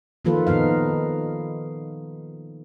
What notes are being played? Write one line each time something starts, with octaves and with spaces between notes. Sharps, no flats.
D#3 F3 A#3 F4 A4 B4
A#2 D#3 B3 D#4 F5